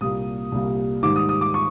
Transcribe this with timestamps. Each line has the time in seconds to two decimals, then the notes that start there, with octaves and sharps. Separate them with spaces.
0.01 C2 A#2 G3 A#3 D#6
0.52 C2 A#2 G3 A#3
1.03 G#2 D#3 G3 D6
1.16 D#6
1.29 D#6
1.41 D6
1.54 C#6